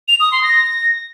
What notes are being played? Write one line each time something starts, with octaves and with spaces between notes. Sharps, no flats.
F7
D#6
C6
A#6